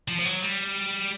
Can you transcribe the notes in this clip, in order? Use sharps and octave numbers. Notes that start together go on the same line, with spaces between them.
F3
F3
F#3
G3